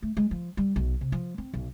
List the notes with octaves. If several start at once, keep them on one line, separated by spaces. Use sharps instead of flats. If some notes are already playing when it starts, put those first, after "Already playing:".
A3
G#3
F3
G3
B1
C3
F3
C4
B1